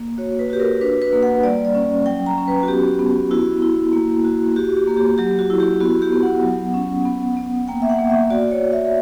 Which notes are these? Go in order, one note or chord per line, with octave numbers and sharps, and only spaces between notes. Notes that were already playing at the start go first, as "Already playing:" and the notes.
Already playing: A#3
F#4 C#5
B4
F#4 G4
A#4
D4 B4
B4
A#3
F#5
G3 D5
D5
C#4
F#3 G5
A#5
C#4
B4
F#4
B3 G4
B3
E4 F#4
E4
A#3
F#4
F#4 G4
G4
A#3
G4
F#3 G4
F#4
E4
G4
B3 F#4
G4
B3
F#5
F#3
C#4
B3
B3
A#3 G5
E5
F#5
A#3
E5
F#4 D5
C#5
F#4
E5